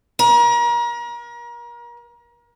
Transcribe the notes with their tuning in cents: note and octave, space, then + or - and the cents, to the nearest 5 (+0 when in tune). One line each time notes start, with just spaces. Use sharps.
A#4 +35